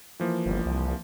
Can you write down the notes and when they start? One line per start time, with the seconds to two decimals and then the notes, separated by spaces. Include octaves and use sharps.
0.20 E3 F3 A#3
0.46 G1
0.66 C2